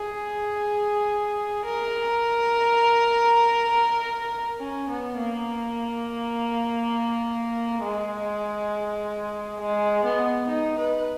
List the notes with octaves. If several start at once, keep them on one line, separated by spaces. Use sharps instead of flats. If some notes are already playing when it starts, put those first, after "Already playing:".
Already playing: G#4
A#4
C#4
B3
A#3
G#3
G#3
B3
D#4
B4